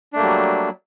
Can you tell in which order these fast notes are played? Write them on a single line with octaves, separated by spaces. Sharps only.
D4 A3 A#3 G3 F#3